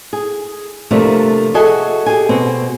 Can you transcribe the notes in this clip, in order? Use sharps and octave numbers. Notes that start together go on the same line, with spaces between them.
G#4
C3 F3 G3 A3 A#3 D4
F#4 G#4 A4 D#5 E5 G#5
G4 G#4 G#5
B2 C4